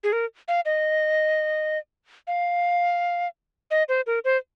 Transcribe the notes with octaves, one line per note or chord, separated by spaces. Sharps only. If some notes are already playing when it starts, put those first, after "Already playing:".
G#4
A#4
F5
D#5
F5
D#5
C5
A#4
C5